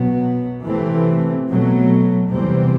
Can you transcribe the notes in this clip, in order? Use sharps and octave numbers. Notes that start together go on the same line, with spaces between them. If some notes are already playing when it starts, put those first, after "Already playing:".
Already playing: B2 F#3 B3
C3 E3 A3 C4
B2 F#3 A3
E2 C3 E3 G3 C4